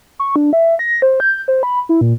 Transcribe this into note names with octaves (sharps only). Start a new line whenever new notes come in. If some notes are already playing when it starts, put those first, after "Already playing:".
C#6
D4
E5
A#6
C5
G6
C5
B5
E4
A#2